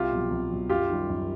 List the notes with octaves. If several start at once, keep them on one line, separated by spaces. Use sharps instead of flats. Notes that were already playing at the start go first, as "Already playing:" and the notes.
Already playing: C2 F4 G4
B2 F#3
C2
B2 F#3
F#2 F4 G4
D#3 G3
F#2